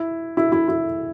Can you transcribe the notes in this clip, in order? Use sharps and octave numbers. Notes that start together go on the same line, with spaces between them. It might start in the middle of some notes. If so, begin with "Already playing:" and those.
Already playing: E4
E4
E4
E4